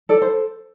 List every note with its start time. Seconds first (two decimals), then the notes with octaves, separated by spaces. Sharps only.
0.09 A4 D5
0.22 C5